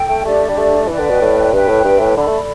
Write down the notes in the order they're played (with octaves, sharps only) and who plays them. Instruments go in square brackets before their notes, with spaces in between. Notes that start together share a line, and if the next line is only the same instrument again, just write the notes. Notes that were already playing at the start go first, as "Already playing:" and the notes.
Already playing: [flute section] A4 G5
[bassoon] A3
[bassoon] A3 [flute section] D4 G4 D5
[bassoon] G3
A3
[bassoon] E3 [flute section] B4 D5 G5
[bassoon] D3
B2
A2
[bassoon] G2 [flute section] B4 E5 G5
[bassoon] A2
G2
A2
[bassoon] D3 [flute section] A4 D5 B5
[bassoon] A3